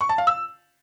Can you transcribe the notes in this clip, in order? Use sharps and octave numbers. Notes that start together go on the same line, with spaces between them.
C#6
A5
F5
E6